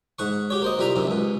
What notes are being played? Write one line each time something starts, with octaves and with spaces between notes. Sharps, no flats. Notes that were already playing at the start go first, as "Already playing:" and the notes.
G#2 F#5 C#6
F#4 G4 C#5
A#3 C5 D#5
C2 G3 F4 E5 A#5
F#2 C3 D#3
C#2 B2